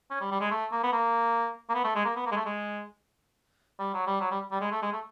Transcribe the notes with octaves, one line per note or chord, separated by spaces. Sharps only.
C#4
G3
G3
G#3
A3
A#3
B3
A#3
A#3
B3
A3
G#3
A#3
B3
A#3
G#3
A3
G#3
G3
F#3
G3
F#3
G3
G3
G#3
A3
G#3
A3